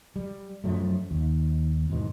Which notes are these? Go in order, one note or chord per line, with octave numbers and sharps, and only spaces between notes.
G3
F#2 F3 F#3 A3
D#2
E2 G#2 B2